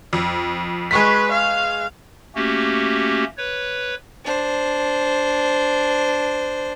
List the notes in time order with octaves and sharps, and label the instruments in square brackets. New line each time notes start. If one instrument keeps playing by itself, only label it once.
[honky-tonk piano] F2
[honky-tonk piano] G#3 C#6 B6 [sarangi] B4
[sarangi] F5
[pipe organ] A3 A#3 C#4 F#4 G4
B4 C#5
[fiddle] D4 C5